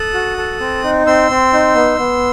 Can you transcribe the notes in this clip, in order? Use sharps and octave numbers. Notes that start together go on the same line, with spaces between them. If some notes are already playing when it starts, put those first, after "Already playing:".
Already playing: A4 D#6 F#6
F#4
A4
C4
D#4
C4 C6 E6
C4
D#4
B3
B3